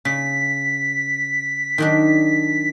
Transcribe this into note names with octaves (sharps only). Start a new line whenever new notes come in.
C#3 B6
D#3 F#3 D4